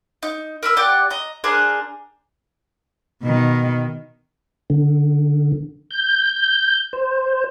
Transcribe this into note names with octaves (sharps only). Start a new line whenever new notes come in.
D#4
A#4 B4 E6
G4 D5 F#5 G5
D#5 A#5
D4 G#4 A#4 C5
B2 D#3
D3
G6
C5